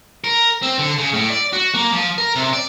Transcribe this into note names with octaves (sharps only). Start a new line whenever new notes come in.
A#4
C4
D3
C#3
A2
D5
F#4
A#3
F3
A#4
C3
D5